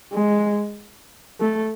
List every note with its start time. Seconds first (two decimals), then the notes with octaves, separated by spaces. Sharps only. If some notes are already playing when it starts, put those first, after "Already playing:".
0.12 G#3
1.40 A3